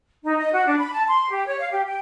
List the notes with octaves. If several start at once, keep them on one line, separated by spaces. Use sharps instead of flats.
D#4
D#5
F#4
D4
B5
A5
C6
G4
C#5
F5
G4
G5